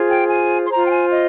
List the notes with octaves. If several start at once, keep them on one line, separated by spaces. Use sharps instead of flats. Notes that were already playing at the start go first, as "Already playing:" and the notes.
Already playing: F4 G#4 C5
G5
G#5
C6
F4 C5 A#5
G5
G#5
D#5